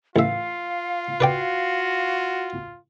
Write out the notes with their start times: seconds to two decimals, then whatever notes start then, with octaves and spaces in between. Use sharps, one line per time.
0.16 A1 F4 E5 F5
1.20 F#4 B4 D5 G5